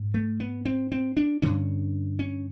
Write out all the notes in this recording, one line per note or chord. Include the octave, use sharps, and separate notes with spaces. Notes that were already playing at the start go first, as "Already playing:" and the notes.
Already playing: G#2
A3
B3
C4
C4
D4
G2 D3 C#4
C#4